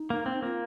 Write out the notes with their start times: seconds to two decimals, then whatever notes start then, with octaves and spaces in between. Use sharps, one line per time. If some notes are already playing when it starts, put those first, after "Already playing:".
Already playing: D#4
0.10 A#3
0.26 C4
0.42 A#3 F4